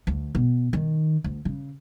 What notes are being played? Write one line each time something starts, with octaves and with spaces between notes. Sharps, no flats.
D2
B2
D#3
D2
C#3